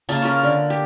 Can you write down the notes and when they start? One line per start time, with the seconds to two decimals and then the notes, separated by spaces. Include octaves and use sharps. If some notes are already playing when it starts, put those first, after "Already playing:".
0.09 C#3 A#3 F4 A5
0.22 C#4 F4 A#4
0.43 D3
0.70 G4